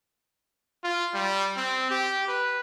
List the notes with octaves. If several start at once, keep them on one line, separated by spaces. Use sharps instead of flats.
F4
G3
C4
G4
B4